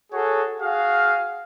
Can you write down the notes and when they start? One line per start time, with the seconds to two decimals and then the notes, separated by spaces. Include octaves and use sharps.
0.12 F#4 G#4 A4 C#5
0.60 F#4 G#4 F5